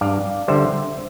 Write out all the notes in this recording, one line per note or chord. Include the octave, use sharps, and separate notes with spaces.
G2 D5 F5
D3 G3 C5 E5